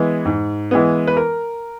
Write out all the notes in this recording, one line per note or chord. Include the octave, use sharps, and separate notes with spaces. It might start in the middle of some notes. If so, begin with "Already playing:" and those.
Already playing: E3 G#3 B3
G#2
E3 G#3 B3
B4
A#4